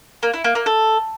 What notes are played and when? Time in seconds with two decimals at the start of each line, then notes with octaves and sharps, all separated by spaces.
0.23 A#3
0.34 E4
0.44 A#3
0.55 A#3
0.66 A4